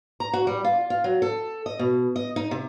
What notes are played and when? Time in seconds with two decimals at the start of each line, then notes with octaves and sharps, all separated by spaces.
0.20 A#5
0.33 F#4
0.47 G3
0.64 F4
0.90 F4
1.04 F#3
1.22 A4
1.66 D#5
1.79 B2
2.16 D#5
2.36 D#4
2.51 C3